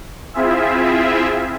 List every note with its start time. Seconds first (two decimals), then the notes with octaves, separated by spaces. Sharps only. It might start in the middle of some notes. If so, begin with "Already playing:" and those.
0.34 C4 E4 F4 G#4 E5